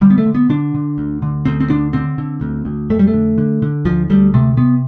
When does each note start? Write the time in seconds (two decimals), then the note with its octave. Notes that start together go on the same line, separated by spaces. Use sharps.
0.01 D3 G3
0.10 B3
0.18 A3
0.26 D3
0.35 B3
0.49 D3 D4
0.75 D3
0.98 D2
1.22 D3
1.45 D2 C4
1.60 C4
1.70 D3 D4
1.93 D3 C4
2.18 D3
2.41 D2
2.65 D2
2.90 F2 A3
2.99 G3
3.07 A3
3.14 D3
3.38 D3
3.62 D3
3.85 D2 F3
4.10 D2 G3
4.34 C3 A3
4.57 C3 B3